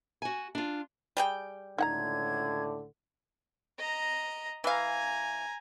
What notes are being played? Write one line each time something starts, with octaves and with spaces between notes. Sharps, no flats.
F#4 G#5
D4 F4
G3 G#4 G5
C#2 A2 D3 D#4 F#5 A#5 G#6
D#5 A#5
E3 F5 G#5 A#5